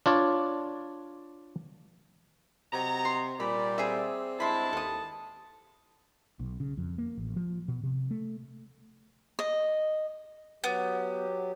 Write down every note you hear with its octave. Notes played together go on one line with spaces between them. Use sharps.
D4 F4 C#5 D5
C3 F#3 D#5 A#5
C6
A#2 G3 D5 B5
C4 G#4 E5
G2 G#3 E4 A5 B5 C6
D#2 A4 D#6
B1
C#3
F2
A#3
A1
F3
B2
C3
A3
D#5
F#3 B3 G4